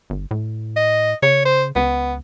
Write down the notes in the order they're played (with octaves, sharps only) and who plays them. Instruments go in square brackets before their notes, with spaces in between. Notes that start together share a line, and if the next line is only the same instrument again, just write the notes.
[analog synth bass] G1
A2
[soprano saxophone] D#5
[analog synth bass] C#3 [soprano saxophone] C#5
[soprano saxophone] C5
[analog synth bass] C#2 [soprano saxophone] B3